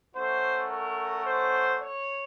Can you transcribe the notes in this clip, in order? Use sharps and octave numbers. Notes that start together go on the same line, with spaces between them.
A3 C#4 F#4 C5
A#4
C5
C#5